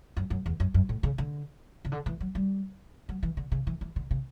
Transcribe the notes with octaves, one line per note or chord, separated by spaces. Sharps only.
F#2
F#2
E2
F#2
F#2
A2
C#3
D3
C#3
D3
E3
F#3
G3
F#3
E3
D3
C#3
E3
E3
D3
C#3